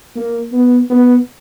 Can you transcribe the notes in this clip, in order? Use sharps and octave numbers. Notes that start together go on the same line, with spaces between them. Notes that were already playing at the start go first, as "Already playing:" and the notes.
A#3
B3
B3